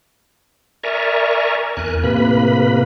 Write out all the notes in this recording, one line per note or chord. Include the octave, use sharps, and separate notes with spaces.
A#4 D5 E5 G#5 A#5 C#6
E2 A#4 G#5 F#6
A2 C3 A#3 B4 B5